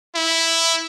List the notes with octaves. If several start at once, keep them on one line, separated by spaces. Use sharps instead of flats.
E4